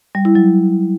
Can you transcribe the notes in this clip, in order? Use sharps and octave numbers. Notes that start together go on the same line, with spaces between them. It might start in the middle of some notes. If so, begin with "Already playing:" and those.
G3
E4
F#3